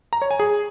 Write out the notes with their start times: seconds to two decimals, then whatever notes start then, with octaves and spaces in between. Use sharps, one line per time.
0.13 A#5
0.22 C#5
0.31 G#5
0.40 G#4